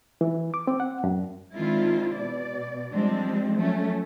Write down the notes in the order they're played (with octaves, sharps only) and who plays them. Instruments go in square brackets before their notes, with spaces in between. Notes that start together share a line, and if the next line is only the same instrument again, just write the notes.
[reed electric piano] E3
D6
C4
F#5
F#2
[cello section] D#3 G#3 C4 D4 E4 F4
B2 D5
F3 G3 G#3 C4 D4
F3 F#3 A3 C#4